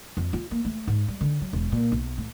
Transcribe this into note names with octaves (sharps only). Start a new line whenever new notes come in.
F2
F4
A#3
A3
G#2
G3
D3
F#3
E1
A#2
B1
A2